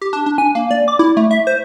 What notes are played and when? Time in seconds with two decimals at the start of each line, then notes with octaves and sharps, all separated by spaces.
0.01 G4
0.13 D4
0.26 D4
0.38 G#5
0.55 A#3
0.71 D5
0.88 D6
0.99 E4
1.17 A3
1.31 E5
1.47 C5